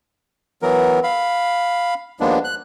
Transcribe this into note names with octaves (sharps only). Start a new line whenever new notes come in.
E3 F#3 B3 A#4
F5 B5
D#2 F3 G#3 A#3 B3 D4
F#6